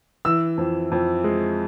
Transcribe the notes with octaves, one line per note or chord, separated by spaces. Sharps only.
E3 E6
F2
F2
G#3